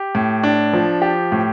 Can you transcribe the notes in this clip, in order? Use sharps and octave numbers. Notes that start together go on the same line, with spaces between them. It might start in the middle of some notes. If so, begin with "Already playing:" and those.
Already playing: G4
A2
D4
F3
G4
A2